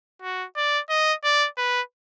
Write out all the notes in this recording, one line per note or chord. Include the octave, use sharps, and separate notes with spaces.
F#4
D5
D#5
D5
B4